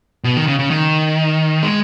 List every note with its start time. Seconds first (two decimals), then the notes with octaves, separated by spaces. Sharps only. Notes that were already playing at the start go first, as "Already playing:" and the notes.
0.24 B2
0.37 D#3
0.47 C#3
0.59 C#3
0.71 D#3
1.63 G#3